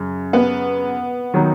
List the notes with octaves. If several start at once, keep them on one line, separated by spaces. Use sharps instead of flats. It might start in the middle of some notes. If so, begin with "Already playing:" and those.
Already playing: F#2 C#3
B3
D#3 F#3 B3 D#4